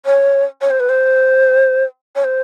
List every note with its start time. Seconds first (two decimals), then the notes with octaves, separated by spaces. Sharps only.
0.06 C#5
0.61 C#5
0.71 C5
0.80 B4
0.89 C5
2.16 C#5
2.24 C5